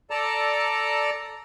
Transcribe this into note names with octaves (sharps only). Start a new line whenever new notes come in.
A4 D5 A5 A#5